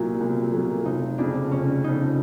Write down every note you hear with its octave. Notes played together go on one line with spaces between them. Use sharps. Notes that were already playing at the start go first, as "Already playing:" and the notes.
Already playing: C2 A#2 F#3 A#3 E4
C2
A#2 F#3 A#3
F1 D#4
F2 C#3 D4
F1 C#4
F2 C#3 D#4